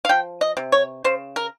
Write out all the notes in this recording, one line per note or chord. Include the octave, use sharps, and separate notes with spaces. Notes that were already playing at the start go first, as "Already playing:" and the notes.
F5
F3 G5
D#5
C3
C#5
C#3 C5
A#4